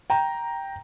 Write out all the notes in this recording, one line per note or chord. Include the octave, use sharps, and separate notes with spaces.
G5 A#5